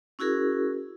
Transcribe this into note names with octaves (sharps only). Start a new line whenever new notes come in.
C#4 E4 F#4 G#4 A#4